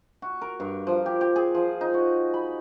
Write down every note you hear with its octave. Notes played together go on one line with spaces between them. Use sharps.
F#4
A#4
G2
F3
G4
G4
G#4
F3
D#4
F#4
B5